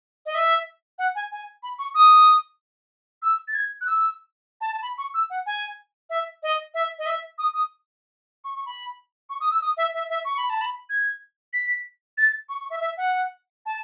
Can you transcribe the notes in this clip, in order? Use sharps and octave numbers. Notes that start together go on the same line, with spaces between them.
D#5
E5
F#5
G#5
G#5
B5
C#6
D#6
E6
A6
G#6
F#6
E6
A5
A5
B5
C#6
E6
F#5
G#5
E5
D#5
E5
D#5
E5
D#6
D#6
C#6
C#6
B5
C#6
D#6
E6
D#6
E5
E5
E5
C#6
B5
A5
B5
G#6
B6
A6
C#6
C#6
E5
E5
F#5
A5